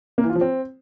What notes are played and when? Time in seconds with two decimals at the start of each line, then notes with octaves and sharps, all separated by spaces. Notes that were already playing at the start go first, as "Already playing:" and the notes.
0.18 A#3
0.24 E3
0.30 F4
0.35 F3
0.41 C4